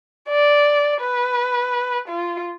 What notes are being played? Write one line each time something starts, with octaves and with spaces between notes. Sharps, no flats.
D5
B4
F4